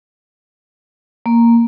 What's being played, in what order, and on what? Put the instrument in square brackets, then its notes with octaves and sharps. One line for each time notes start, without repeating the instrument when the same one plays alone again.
[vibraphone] A#3